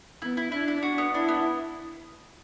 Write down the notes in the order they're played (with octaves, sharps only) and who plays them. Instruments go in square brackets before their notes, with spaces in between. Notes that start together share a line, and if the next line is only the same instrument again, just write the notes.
[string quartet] B3 [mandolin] E4
[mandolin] E4
[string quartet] D4 [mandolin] E4
[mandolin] E4
F#4
B3
[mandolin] D4 [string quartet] E4
[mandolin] B3